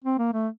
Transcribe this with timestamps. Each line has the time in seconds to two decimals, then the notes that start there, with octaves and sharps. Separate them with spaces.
0.04 C4
0.18 A#3
0.33 A3